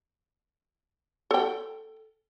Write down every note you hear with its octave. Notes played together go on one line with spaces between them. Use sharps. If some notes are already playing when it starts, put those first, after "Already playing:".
A4 G5